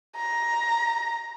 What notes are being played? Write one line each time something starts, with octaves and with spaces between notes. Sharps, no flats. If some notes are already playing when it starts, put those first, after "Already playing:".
A#5